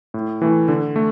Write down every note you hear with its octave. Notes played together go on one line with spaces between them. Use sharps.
A2
E3 A3
D3
A3